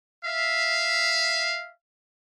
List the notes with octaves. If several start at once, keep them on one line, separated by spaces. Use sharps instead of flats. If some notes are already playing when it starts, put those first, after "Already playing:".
E5 F5